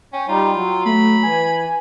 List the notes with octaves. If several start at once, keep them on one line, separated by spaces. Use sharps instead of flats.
C#4 G5
G3 D#4 F4
F#3
A3 B5
E3 G#5